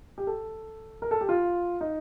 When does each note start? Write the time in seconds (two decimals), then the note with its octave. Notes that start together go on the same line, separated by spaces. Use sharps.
0.18 G4
0.27 A4
1.02 A#4
1.11 A4
1.21 G4
1.29 F4
1.81 D#4